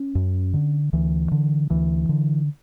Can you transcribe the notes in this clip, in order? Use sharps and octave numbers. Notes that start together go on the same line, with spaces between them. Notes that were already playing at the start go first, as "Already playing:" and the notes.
Already playing: C#4
F#2
D3
D2 E3
D3
D2 E3
D3